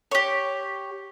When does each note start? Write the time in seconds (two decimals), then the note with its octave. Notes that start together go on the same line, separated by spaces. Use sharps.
0.11 G4 C#5